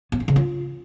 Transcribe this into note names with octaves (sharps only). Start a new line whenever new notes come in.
B3
E4
C#3
F4